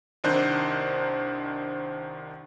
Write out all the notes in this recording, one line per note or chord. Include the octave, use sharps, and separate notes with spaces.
C2 D#3 D4 D#4 C5 F#6